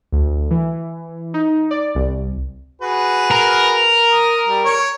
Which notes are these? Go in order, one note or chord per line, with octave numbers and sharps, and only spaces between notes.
D2
E3
D#4
D5
C2
F#4 G#4 B4
A#4
D#6
G3
C#5 C#6